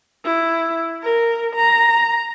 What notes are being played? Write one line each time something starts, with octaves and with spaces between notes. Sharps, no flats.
E4
A#4
A#5